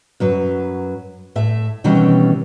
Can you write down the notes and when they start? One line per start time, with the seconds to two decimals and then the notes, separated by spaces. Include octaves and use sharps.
0.20 F#2 F#3 B4
1.35 A2 A3 E5
1.84 B2 D#3 E3 G3 C4 C#4